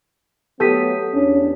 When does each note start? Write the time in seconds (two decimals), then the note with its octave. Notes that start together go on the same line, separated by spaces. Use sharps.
0.60 F#3 A3 B3 G4 A4 D#6 B6
1.14 E2 C#4 D4